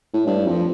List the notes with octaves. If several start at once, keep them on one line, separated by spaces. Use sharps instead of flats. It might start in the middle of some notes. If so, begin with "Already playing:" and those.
A2
G2
F2